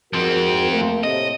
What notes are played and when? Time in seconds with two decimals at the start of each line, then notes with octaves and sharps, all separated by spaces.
0.13 G#1 F3 C4 F#4 A#4
0.71 A3 A#3
1.03 A2 C3 D#5